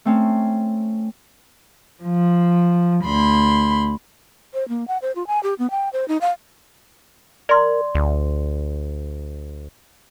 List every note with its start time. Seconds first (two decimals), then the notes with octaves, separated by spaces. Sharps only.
0.05 A3 C4 C#4
2.04 F3
3.06 D2 B5 C6
4.54 C5
4.69 A#3
4.88 F#5
5.02 C5
5.16 F4
5.27 G#5
5.43 G4
5.59 B3
5.71 G5
5.93 C5
6.08 D#4
6.21 F5
7.49 A#4 D5 C6
7.95 D2